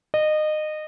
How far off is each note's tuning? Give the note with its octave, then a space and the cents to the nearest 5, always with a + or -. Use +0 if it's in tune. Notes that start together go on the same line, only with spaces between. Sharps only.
D#5 -25